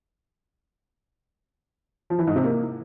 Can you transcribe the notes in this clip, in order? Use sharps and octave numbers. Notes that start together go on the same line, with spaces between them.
F3
E3
G#2
C3
A#3